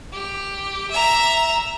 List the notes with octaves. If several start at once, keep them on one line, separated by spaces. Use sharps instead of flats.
G4
E5 A#5